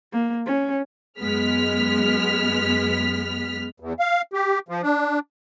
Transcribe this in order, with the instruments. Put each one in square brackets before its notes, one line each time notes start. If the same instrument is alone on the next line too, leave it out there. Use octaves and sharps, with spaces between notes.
[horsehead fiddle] A#3
C#4
[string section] F#2 G#3 B3 F6 B6
[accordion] E2
F5
G4
F3
D4